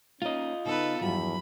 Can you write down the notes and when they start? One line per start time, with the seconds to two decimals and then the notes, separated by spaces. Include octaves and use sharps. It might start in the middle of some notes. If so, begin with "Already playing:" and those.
0.22 A#3 C#4 D#4 F4 C#5 D#5
0.65 C#3 B3 D#4 A4 B4
1.01 E2 G2 F3 F#3 B5